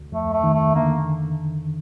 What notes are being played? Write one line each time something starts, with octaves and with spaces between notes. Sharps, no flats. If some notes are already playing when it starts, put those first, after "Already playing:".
Already playing: D2
F2 A3
A3
D#3
A3
D3 A#3